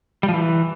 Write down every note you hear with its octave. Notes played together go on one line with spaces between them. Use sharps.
G3
F3
E3